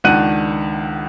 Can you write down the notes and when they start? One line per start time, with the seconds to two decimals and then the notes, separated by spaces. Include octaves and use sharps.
0.04 C#2 D#3 D4 F#5 F#6 D#7